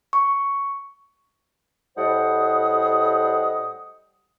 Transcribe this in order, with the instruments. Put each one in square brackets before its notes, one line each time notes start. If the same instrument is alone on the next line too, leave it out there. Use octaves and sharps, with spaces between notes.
[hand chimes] C#6
[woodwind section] A2 G3 C5 D#5 F#5 D#6